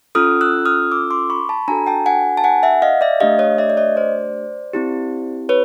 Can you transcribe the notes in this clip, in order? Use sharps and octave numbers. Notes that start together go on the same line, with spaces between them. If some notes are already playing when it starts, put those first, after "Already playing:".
C#4 F4 A4 D#6 F6
E6 F#6
D#6 F6
D6 E6
C6 D6
B5 C#6
A5 B5
D4 F#4 A4 G#5 A#5
G5 A5
F#5 G#5
A5
F#5 G#5
E5 F#5
D#5 F5
D5 E5
A3 D4 G4 D#5 F5
C#5 D#5
D5 E5
D5
C#5 D#5
C5 D5
C4 E4 G4
B4 C#5